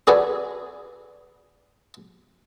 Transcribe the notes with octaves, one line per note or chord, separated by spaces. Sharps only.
D4 F#4 G#4 A4 B4 D5